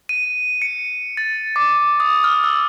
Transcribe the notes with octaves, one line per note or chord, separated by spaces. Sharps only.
D#7
C#7
A6
D6
D#6
F6
E6